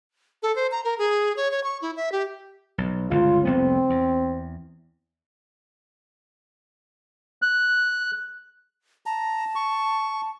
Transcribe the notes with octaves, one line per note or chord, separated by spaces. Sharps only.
A4
C5
A#5
A#4
G#4
C#5
C#5
C#6
E4
E5
G4
B1
G1 C#2 F4
F1 C2 B3 C4
E2
F#6
A5 A#5
C#6